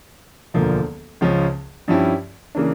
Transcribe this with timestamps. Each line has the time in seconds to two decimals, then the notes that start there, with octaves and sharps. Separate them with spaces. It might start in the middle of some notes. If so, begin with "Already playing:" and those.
0.54 E1 D2 D3 F3 A#3
1.21 C#2 C#3 F3 C#4
1.88 G2 F3 C#4 E4 G4
2.55 C#3 E3 A#3 D4